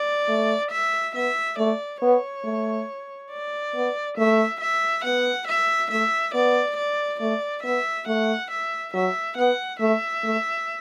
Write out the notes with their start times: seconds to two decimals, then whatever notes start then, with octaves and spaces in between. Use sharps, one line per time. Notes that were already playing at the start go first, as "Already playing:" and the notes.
Already playing: D5
0.28 A3
0.71 E5
1.15 B3 E5
1.58 A3 D5
2.02 B3 C#5
2.44 A3
3.31 D5
3.75 B3
4.18 A3 E5
4.61 E5
5.04 B3 F#5
5.48 E5
5.91 A3 E5
6.34 B3 D5
6.77 D5
7.20 A3 D5
7.64 B3 E5
8.07 A3 F#5
8.51 E5
8.94 F#3 E5
9.37 B3 F#5
9.80 A3 E5
10.24 A3